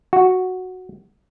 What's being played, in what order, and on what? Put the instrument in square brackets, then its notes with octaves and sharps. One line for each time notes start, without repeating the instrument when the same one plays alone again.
[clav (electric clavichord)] F#4